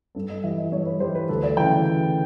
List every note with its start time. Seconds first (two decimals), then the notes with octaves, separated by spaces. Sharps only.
0.15 G2 A4
0.29 D#5
0.44 E3 G3 E5
0.58 D#5
0.72 G2 C#5
0.86 B4
1.00 E3 G3 C5
1.15 B4
1.29 D2 A4
1.43 D5
1.57 C#3 E3 G5